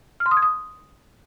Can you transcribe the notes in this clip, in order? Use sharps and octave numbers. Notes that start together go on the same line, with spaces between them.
F6
C6
D#6
G#6
D#6